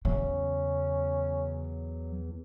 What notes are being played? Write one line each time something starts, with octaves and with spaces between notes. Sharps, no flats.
E2 C#3 F#3 C#4